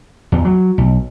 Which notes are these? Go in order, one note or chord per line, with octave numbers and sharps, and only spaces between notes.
E2
F#3
B1